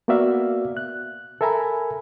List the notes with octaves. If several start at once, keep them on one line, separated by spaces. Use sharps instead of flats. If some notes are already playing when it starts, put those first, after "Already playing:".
A#3 B3 F#4 D5 E5 F5
F#6
A4 A#4 E5 G#5 A#5 B5